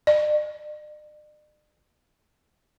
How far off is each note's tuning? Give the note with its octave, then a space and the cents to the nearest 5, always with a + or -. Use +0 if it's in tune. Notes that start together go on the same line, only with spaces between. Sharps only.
D5 +45